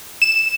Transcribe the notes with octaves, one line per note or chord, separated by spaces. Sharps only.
E7